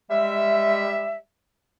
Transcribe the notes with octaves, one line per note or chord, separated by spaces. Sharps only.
G3 G#3 E5